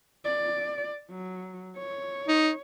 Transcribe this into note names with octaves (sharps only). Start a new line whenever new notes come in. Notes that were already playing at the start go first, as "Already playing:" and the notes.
D5
F#3
C#5
D#4